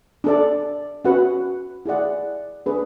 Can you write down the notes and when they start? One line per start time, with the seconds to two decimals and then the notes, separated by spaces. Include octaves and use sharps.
0.24 D4 A4 D5
1.05 C#4 F#4 B4 F#5
1.86 E4 G#4 D5 F#5
2.66 D4 G#4 B4